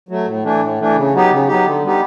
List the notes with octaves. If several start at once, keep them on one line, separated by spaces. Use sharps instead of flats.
F#3 A3
A2
E3 A3 D4
A2
E3 A3 D4
C#3
F#3 B3 D#4 G4
C#3
F#3 B3 D#4 G4
D3
G3 B3 D#4 G4